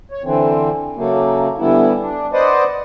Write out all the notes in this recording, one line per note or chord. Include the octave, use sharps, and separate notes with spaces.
C#5
D3 E3 C4
C#3 F#3 A3 A#3
D3 E3 G3 B3 E4
D4
B4 C5 D5 D#5 F#5